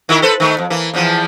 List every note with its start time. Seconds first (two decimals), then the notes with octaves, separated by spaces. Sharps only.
0.09 D#3 E4 A#4
0.22 A4 B4 C5
0.40 D#3 A3
0.58 F2
0.70 E3 A#3
0.94 E2 E3 F3